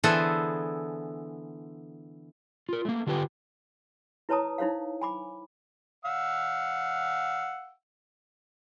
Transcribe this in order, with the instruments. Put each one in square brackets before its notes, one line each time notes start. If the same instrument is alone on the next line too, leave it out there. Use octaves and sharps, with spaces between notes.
[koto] D3 E3 B3 G#4 A4 C5
[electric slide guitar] F4 A#4
A3 A#3
D3 F4 G4 B4 G5
[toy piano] E4 B4 C#5 A5 A#5 D#6
D#4 E4 C5 C#5 F5
G#5 B5 D6
[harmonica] F5 F#5 E6